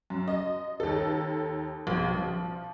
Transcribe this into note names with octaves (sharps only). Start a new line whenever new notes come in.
F#2
D#5
D#2 A4
A#1 B2
F3